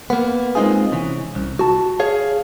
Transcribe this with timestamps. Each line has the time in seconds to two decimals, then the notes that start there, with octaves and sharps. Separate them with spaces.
0.10 A#3 B3
0.55 G#3 C4 D#4 F4 G#4
0.92 C3 E3 C#4
1.35 C2
1.59 F#4 A5
2.00 G#4 C#5 F5